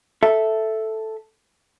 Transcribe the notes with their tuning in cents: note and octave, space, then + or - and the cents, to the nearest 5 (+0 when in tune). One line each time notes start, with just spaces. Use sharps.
A4 +0 E5 +0